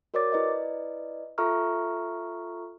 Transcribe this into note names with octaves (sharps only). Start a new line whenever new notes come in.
F#4 A#4 C#5 D5 D6 A6
E4 B4 D5 D#5
F4 A4 E5 A#5 C#6 F6